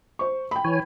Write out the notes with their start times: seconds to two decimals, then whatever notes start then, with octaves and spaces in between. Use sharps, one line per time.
0.19 C5 C#6
0.51 G5 B5
0.65 E3 C#5 G#5